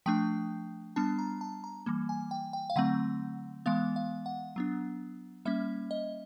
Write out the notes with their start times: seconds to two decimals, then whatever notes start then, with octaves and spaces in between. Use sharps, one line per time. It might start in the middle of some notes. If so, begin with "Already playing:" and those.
0.06 F3 A3 D4 G5
0.96 G3 B3 D4 A5
1.19 A#5
1.41 A5
1.64 A#5
1.86 E3 G3 A#3
2.09 G#5
2.31 G5
2.53 G5
2.70 F5
2.76 D3 F#3 A3 C4 F#5
3.66 E3 G#3 B3 F5
3.96 F5
4.26 F#5
4.56 F#3 B3 D4
5.45 G3 A#3 C#4 E5
5.91 D#5